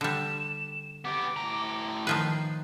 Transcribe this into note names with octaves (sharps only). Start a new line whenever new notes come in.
D3 G3 E7
B3 G4 D6
A2 A#5
D#3 F3 B4 C7